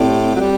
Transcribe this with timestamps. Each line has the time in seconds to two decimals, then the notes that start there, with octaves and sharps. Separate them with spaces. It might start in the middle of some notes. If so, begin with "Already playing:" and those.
Already playing: A2 C4 G4 D5
0.36 F#3
0.40 G3